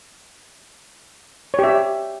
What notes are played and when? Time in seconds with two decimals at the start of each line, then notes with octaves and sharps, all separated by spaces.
1.54 C#5
1.59 G4
1.64 E5